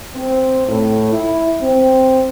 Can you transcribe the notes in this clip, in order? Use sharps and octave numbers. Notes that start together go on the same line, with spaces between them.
C4
A2
E4
C4